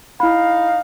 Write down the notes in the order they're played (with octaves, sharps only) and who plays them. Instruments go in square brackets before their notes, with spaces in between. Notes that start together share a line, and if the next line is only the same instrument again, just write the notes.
[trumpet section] D#4 F5 [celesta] E4 B5